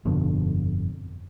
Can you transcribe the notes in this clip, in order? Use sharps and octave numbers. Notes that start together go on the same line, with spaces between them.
G1 F2 B2 D3